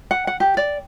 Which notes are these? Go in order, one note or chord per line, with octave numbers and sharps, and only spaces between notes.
F#5
F#5
G4
D5